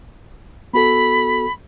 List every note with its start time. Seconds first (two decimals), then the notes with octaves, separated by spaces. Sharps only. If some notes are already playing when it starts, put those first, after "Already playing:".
0.73 B3 F#4 A4 B5